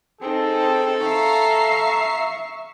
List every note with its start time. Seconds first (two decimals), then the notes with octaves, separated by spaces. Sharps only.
0.21 C4 D#4 G#4 A4
1.01 E5 F5 A#5 C#6 C7